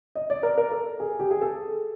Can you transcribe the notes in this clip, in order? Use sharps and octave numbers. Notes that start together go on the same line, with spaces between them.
D#5
D5
A#4
A#4
A4
G#4
G4
G#4
A4